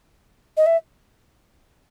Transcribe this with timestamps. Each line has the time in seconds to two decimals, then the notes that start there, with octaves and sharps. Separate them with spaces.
0.57 D#5
0.66 E5